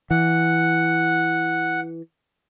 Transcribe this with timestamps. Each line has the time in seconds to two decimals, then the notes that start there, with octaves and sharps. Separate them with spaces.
0.11 E3 F#5